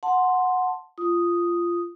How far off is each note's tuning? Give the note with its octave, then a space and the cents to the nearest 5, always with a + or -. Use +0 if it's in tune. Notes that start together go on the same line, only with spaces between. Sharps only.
F#5 -10 A5 +5 C6 +0
F4 -15 D#6 +0